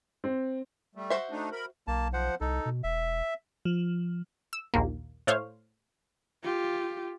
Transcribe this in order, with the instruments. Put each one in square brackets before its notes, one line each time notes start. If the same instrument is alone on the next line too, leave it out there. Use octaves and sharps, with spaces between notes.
[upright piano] C4
[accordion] G3 A3
[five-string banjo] F#4 C5 E5
[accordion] A3 D4 D#4
A#4 B5
[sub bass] B1 [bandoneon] A#3 A5
[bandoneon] F3 C5 F#5
[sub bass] C2 [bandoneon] D#4 A4
[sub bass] B2
[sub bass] E1 [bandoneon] E5
[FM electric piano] F3
[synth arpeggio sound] E6
A#1 D#2 A#3
A2 A3 C5 C#5 F5
[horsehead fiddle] F4 G4